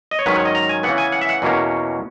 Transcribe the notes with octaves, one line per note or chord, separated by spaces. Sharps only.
D#5
C#5
G#2 D#3 F#3 C#4 B4
C#5
D#5
A#5
G#5
C#3 E3 B3 F#5
G#5
F#5
E5
F#5
E2 B2 A#3 C#4